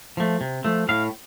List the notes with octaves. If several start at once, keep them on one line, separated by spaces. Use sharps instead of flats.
F3 A3
C3
F3 A3
A2 F5